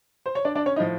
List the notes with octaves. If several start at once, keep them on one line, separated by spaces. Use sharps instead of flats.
C5
C#5
D4 D5
D4 D5
C#4 C#5
A2 F3 D#4 D#5